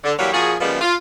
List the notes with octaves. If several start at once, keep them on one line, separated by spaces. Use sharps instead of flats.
D3
E3 F#3 G3 A#3 G4 C#5
A#2 F3 F#4 G#4
C#3 F3 G3 G#3 A#3 B3
F4